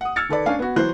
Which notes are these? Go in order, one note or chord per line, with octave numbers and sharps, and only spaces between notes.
F#5 D#6
E6 F6 G#6 A6 C#7
D#3 A4 B4 D5
C#4 D4 F5 G#5
B3 F#4
E3 F#3 C5 C6 F#6